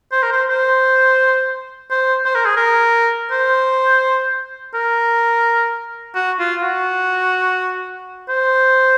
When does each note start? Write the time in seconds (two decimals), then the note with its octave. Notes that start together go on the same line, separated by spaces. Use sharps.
0.12 C5
0.23 A#4
0.32 C5
0.49 C5
1.90 C5
2.25 C5
2.35 A#4
2.45 G#4
2.57 A#4
3.31 C5
4.74 A#4
6.15 F#4
6.39 F4
6.63 F#4
8.29 C5